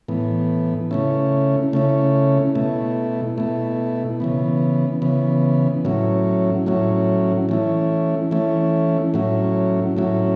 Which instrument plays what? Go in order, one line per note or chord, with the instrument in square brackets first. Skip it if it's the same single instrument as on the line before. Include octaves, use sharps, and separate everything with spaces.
[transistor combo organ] A2 E3 B3
C#3 A3 C#4 E4
C#3 A3 C#4 E4
B2 A3 E4
B2 A3 E4
C#3 E3 B3
C#3 E3 B3
A2 F#3 C#4 E4
A2 F#3 C#4 E4
E3 A3 C#4 E4
E3 A3 C#4 E4
A2 F#3 C#4 E4
A2 F#3 C#4 E4